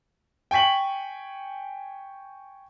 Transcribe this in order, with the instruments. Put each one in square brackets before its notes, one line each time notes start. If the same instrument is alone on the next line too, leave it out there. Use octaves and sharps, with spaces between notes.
[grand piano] G5 G#5 C#6 B6 F#7